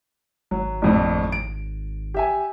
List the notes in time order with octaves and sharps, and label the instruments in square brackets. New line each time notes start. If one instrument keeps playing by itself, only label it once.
[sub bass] G#1 [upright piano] F#3
[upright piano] A#1 F2 A2
D7
G4 E5 G#5